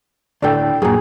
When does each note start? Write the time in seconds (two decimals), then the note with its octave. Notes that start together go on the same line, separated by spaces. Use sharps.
0.42 D2 A2 D4 A4 G5
0.82 F#2 A#2 G#4